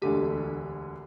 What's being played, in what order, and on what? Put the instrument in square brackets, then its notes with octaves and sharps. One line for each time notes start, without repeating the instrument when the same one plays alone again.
[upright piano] E1 D2 D3 A3 [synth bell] G4